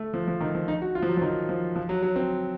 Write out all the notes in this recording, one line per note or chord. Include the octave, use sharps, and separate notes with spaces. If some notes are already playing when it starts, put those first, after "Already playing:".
Already playing: A3
F3
F3
D#3
F3
D#4
F#4
F4
F3
F#3
F3
D#3
F3
F3
F#3
F#3
C4